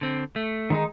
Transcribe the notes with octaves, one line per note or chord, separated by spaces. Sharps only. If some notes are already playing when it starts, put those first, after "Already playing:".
D3 C4
A3
D#3 G#3 D#4